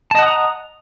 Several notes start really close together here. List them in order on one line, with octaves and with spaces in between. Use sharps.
A5 D#5 F#5 D#6 A#5